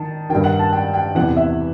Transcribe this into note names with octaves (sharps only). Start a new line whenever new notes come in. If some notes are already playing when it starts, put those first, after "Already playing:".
Already playing: D#3 A5
D#3 G5
G2
F#5
A5
G5
G5
E2 C3 E3 F#5
E5